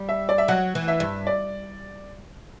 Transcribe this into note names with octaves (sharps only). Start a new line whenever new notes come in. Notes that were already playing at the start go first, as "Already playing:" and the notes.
Already playing: G3
E5
D5
E5
F#3 F#5
E3
E5
G2
D5